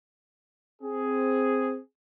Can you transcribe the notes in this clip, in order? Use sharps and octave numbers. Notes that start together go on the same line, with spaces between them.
C4 G#4